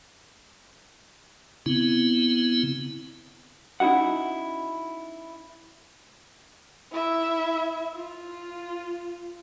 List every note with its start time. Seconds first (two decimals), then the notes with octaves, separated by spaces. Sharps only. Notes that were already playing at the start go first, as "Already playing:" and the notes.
1.66 C#3 B3 C4 E4
3.80 C#4 D#4 E4 F#4 F#5
6.92 E4 E5
7.94 F4